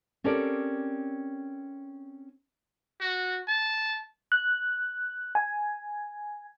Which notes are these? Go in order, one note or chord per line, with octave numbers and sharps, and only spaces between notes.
C4 C#4 G4 A4 A#4 D5
F#4
A5
F#6
G#5